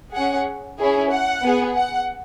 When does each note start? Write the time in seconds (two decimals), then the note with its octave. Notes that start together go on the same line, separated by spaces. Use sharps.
0.13 C#4 G#4 F#5
0.78 C#4 E4 G#4
1.10 F#5
1.43 B3 G#4
1.76 F#5